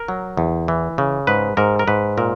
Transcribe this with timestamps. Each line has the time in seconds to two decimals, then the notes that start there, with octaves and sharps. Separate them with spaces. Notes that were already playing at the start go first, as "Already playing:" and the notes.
Already playing: A#4
0.08 F#3
0.37 E2
0.68 E3
0.98 C#3
1.27 G#2 B4
1.57 G#2 A#4
1.79 A#4
1.87 G#2 B4
2.18 A#2 A#4